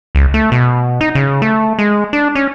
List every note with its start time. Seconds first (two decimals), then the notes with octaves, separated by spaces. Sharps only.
0.15 C#2
0.34 A3
0.52 B2
1.01 D#4
1.15 C#3
1.42 A3
1.79 G#3
2.13 D4
2.35 C#4